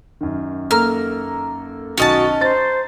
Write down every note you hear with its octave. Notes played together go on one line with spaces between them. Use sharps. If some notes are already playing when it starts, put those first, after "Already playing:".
F#2 D#3
A#3 A4 A#5 F6
B1 D#3 C#4 F#4 D#5 A5
C5 A#5 A6